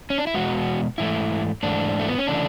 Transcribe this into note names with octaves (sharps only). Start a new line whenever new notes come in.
C#4
D4
E4
E2 B2 G#3 F#4
G#2 E3 A3 E4
G#2 E3 A3 D4
A3
B3
C#4
C#3 E3 A3 D4